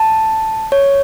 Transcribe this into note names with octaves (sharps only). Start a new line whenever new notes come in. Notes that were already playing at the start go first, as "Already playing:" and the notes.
Already playing: A5
C#5